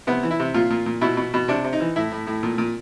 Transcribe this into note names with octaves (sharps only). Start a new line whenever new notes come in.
C3 B3
E3
E4
C3
A#2 F4
A#2
A#2
B2 E4
B2
B2
C3 D4
C3
D#4
E3
A2 E4
A2
A2
A#2
A#2